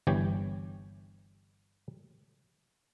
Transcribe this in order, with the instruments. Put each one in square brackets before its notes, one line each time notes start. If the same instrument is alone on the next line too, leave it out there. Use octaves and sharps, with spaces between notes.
[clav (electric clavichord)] G1 E3 G4 C#5 G#5